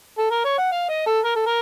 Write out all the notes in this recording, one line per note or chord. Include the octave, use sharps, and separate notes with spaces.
A4
A#4
C#5
F#5
F5
D#5
A4
A#4
A4
A#4